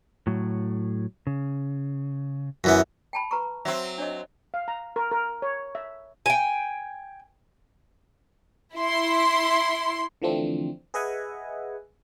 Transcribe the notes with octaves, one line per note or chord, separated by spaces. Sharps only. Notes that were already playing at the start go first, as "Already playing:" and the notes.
A2 F#3
C#3
F#2 E3 B3
G5 A5 B5
B4 A#5 C#6
F#3 C4 E5
D4 C#5 D#5
F5
A#5
A#4
A#4
C#5
E5
G5 G#5
E4 C6
D3 E3 F3 A3 C4 D4
G#4 B4 D#5 E5 F#5 G#5